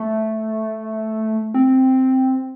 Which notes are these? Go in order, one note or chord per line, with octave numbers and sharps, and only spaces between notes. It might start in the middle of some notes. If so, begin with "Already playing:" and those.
Already playing: A3
C4